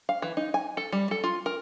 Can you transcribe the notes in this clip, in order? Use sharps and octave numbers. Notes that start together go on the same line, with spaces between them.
F5
E3
D#4
G#5
A4
G3
A4
F4
A#4